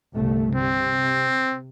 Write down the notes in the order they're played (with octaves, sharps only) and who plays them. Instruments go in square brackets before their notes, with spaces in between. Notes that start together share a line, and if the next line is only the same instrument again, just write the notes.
[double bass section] G1 C2 A3
[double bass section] C3 [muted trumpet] C4